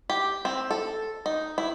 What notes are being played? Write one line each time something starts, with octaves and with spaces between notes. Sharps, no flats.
G4
C4
A4
D#4
E4